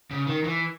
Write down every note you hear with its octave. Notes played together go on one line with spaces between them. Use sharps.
C#3
D#3
E3